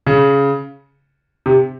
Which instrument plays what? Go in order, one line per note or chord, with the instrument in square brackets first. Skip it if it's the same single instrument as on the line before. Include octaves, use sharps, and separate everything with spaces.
[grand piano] C#3
C3